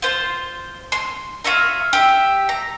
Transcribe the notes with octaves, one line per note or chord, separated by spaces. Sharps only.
F4 C5
C6
F4 C#5 E5 A#5
G4 E5
A#5